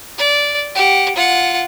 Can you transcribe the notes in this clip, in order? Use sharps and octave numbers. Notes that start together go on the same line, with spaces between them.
D5
G4 F#5
F4 F#5